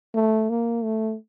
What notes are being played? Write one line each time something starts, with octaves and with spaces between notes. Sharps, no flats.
A3
A#3
A3